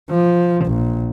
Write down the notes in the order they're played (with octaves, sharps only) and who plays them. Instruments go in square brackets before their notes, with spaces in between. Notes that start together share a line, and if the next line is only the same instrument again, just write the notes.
[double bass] F3
A#1